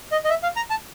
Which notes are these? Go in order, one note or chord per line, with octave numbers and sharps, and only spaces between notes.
D#5
D#5
E5
F5
A#5
A5